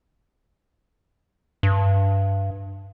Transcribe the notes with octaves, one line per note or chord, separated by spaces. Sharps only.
G2